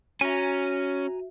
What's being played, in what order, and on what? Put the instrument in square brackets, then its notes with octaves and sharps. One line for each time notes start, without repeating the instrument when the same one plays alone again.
[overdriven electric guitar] C#4 [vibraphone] F#4 E5 [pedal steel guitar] G#5 A#5